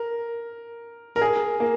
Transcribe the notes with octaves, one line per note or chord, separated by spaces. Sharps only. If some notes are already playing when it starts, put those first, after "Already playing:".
Already playing: A#4
A#4
G#4
A#3